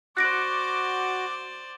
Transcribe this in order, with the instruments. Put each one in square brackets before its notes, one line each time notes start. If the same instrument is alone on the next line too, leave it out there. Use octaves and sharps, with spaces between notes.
[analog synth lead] F#4 [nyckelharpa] C5 D5 [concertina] D6 [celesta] F#6 A#6 D7